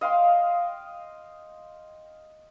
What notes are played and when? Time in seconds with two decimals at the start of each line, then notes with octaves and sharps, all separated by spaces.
0.01 D#5 F5 G5 C6